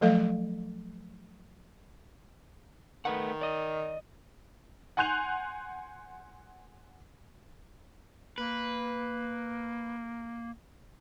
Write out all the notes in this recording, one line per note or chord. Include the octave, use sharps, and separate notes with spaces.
F3 F#3 A3 A4 D#5 F5
D#3 A3 B4 F#5
D5 D#5
F#5 G#5 C6 F#6 G6 F7
A#3 B4